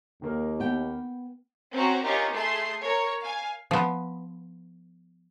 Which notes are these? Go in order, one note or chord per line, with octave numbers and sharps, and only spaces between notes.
D#2 D#3 A#3 A#4
B3 G5
C4 C#4 F#4 A#5
C#4 D#4 F4 G4 A#4
A3 G#4 C6 C7
A#4 C#5
F5 G#5
F3 B3